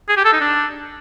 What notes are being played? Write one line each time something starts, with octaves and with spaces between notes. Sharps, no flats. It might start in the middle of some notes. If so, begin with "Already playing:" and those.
G#4
G4
A4
D#4
D4